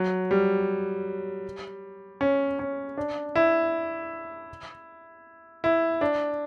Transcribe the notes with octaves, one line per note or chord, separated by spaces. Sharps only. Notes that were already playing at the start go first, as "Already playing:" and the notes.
Already playing: F#3
G3
C#4
C#4
D4
E4
E4
D4